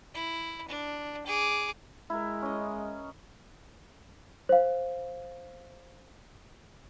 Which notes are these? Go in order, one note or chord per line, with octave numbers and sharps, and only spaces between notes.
E4
D4
G#4 D6
G#3 E4 A#4
C#4 D#5
C5 F5